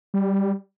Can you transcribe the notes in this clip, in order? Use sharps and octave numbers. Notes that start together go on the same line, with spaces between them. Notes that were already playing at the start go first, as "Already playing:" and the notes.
G3